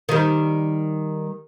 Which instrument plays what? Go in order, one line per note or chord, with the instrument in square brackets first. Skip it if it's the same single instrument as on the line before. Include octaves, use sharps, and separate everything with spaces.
[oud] D#3 G3